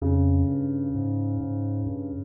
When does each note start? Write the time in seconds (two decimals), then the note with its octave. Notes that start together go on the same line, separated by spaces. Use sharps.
0.02 F2 C#3
0.48 G2
0.95 G#2
1.40 G#2
1.86 G2